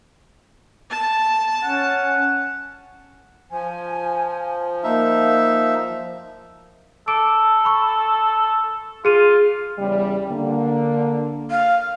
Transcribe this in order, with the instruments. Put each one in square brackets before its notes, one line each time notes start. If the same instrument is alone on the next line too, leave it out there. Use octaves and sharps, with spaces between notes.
[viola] A5
[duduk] C#4 [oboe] F#5
[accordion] F3 [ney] G#5
[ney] A#3 [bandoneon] D#4 E5
[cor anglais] A4 [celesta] D6 D7
[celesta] B5 C#6
[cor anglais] F4 [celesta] G#4 D#7
[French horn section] E2 C#3 G3
D3 A#3
[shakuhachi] F5